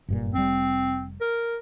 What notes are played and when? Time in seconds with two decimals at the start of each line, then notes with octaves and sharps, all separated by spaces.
0.08 F#1 G2 A#2
0.34 F1 G3 C4
1.21 A#4